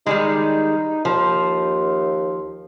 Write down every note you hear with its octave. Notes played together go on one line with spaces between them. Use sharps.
D#3 G3 G#3 D#4
D#2 F3